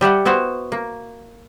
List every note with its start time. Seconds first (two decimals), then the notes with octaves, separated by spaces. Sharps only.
0.01 G3 G4 E5 F#5
0.25 B3 E4 F#4 C5
0.72 A#3